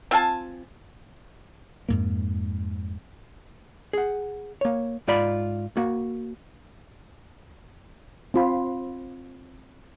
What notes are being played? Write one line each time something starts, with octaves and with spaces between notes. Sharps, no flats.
C4 F4 G#5 A5
F2 G#2 A#3
G#4 F#5
A#3 C#5
G#2 F4 D5 B5
A#3 F#4
C4 F4 B5